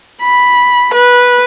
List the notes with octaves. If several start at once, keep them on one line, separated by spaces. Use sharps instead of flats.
B5
B4